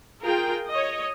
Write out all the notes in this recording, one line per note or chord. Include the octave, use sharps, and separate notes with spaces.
F4 G#4 A#4 G5
C#5 D#5